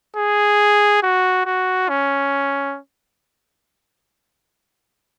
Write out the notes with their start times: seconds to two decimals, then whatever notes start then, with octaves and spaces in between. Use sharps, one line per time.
0.16 G#4
1.03 F#4
1.46 F#4
1.89 C#4